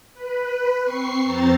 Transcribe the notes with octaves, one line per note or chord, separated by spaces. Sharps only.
B4
C4 C#6 C7
F2 C4 C5 A#5 A6